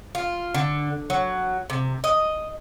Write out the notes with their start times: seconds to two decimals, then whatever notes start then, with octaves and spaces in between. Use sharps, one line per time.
0.15 F4
0.54 D3
1.10 F#3
1.70 C3
2.04 D#5